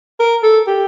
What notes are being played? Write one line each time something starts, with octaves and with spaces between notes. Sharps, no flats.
A#4
A4
G4